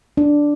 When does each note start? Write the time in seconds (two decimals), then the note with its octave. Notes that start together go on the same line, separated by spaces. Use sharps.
0.17 D4